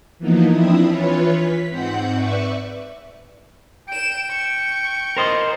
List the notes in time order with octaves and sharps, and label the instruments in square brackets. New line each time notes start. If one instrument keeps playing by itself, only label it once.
[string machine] E3 F3 A#3 B3 D#4
F3 C4 D4 E4 E5 D#6
E3 F4 B4 C#5
B6
G#2 C4 F#5 G6
B4 D5 E5 C#6
[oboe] G5 [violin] D7 E7
[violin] C#6
[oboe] F4 [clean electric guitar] A#4 C5 D#5